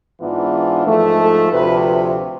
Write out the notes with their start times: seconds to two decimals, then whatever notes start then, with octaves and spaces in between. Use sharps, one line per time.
0.20 G#2 E3 B3 D4 F4
0.85 G#2 F3 A3
1.19 A4
1.52 D2 C3 F3 B4